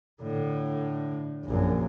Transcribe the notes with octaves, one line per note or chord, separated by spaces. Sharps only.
A2 D3
A#1 F#2